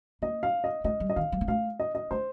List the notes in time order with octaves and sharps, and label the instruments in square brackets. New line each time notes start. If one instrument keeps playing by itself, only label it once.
[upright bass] A#3 [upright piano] D#5
[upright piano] F5
D#5
[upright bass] A3 [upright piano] D#5
[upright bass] G3
[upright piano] D#5
[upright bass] D#3 [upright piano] F5
[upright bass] G3
A#3
[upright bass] A3 [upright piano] F5
[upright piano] D#5
D#5
[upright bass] A3 [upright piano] C5